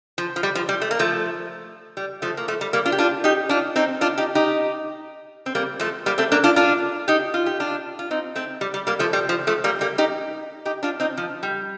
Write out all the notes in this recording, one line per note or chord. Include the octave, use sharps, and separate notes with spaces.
F3
F3
G3
F3
G3
A3
A#3
F3 A3
G3
F3 A3
A#3
F3 A3
G3
G3 A#3
D4 F4
G4
D4 F4
D#4 G4
D4 F4
C4 D#4
D4 F4
D#4 G4
D#4 G4
C4
G3 A#3
F3 A3
G3 A#3
A3 C4
A#3 D4
D4 F4
D4 F4
D#4 G4
F4
G4
D4 F4
F4
C4 D#4
A3 C4
G3
G3
G3 A#3
F3 A3
G3
F3
F3 A3
G3 A#3
G3 A#3
D#4 G4
D#4 G4
D4 F4
C4 D#4
F3
G3